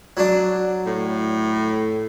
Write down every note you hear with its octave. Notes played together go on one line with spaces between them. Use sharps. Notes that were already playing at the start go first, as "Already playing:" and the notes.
F#3 D4
A2